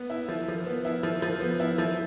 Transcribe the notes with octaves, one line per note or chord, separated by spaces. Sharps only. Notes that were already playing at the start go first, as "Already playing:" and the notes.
Already playing: B3
E4
F3
F3
B3
E4
F3
F3
B3
E4
F3